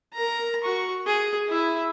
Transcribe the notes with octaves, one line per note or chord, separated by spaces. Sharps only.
A#4 A#5
F#4 C#6
G#4
E4 E5